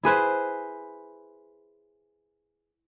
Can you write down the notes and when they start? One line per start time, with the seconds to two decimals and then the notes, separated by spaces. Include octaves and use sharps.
0.03 E4 G#4 B4 C5